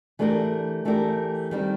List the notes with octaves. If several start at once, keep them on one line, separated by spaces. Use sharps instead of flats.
E3 A3 D4 G4 A#4
E3 A3 D4 G4 A#4
D#3 G3 C4